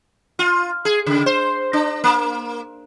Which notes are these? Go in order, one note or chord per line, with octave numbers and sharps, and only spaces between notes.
F4
G#4
C#3
C5
D4
A#3